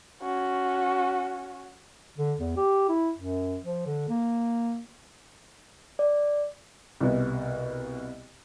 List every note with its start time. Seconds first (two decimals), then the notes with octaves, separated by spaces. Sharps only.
0.22 C#4 F#4
2.17 D3
2.38 E2
2.57 G4
2.89 E4
3.17 F#2
3.64 F3
3.86 D3
4.09 A#3
5.99 D5
7.00 C2 B2